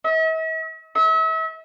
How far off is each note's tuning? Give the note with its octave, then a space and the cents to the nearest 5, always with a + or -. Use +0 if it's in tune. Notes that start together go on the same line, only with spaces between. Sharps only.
E5 -45
E5 -35